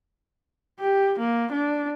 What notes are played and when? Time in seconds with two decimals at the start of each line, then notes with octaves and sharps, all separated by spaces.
0.80 G4
1.19 A#3
1.52 D4